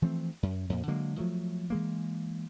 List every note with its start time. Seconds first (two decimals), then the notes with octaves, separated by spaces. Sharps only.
0.02 E3 F3 A3 C4
0.43 F#2
0.70 F2 A#2
0.87 D3 F#3 G#3 A#3
1.18 F3 F#3 A3
1.70 E3 G#3 A#3